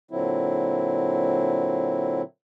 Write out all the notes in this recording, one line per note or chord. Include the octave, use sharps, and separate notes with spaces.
A#2 D3 F#3 C4 E4